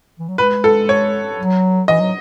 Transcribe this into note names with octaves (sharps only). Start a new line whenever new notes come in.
E3
F#3
G#3 B4
A4
C#5
F#3
E3 D#5
F#3